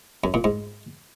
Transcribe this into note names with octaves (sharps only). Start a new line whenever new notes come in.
F#2
A#2
G#2